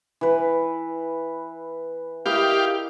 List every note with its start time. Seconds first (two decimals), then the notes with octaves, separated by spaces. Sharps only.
0.21 E3 B4
2.26 E4 G4 A#4 D#5 F5